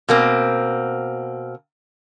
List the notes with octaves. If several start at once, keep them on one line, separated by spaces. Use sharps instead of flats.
B2 A#3 C4